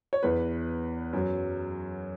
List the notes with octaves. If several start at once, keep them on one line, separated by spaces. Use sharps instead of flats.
C#5
E2 E3 B4
F#2 F#3